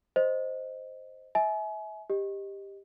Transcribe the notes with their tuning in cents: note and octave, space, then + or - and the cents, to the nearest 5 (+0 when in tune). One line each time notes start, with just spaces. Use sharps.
C5 +0 D#5 +0
E5 -25 G#5 +35
G4 +10 D#5 +0